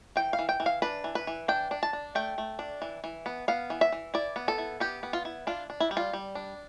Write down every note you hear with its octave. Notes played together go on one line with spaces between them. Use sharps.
E3 G5
F5
E3
G5
E3
F5
D4 B4
E3
B4
E3
D4 G5
D4
A5
D4
A3 G5
A3
D4
E3
E3
B3
B3 F5
E3
E5
E3
E4 D5
B3
A4
E4
B3 G4
B3
F4
E4
D4 F4
D4
E4
G3
F4
G3
D4